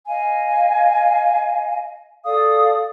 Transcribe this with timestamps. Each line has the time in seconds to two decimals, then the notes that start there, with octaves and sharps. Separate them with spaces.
0.08 D#5 F5 G#5
2.25 A4 D5 F5 D#6